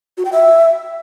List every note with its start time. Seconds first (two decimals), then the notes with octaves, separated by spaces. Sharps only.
0.18 F#4
0.25 G5
0.32 E5